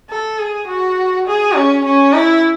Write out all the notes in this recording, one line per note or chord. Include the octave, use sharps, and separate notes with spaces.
A4
G#4
F#4
G#4
C#4
C#4
E4